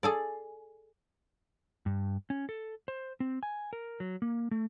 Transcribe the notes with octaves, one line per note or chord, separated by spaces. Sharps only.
G#4 A4 D5
G2
C#4
A4
C5
C4
G#5
A#4
F#3
A#3
A3